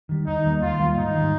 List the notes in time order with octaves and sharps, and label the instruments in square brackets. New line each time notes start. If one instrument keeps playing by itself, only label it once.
[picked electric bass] D#3 G3
[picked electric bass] D#2 [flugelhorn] D#4
[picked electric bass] D#3 G3 A#3
[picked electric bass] D#2 [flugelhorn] F4
[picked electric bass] D#3 G3 A#3
[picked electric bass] G#2 [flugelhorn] D#4
[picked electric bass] D#3 G3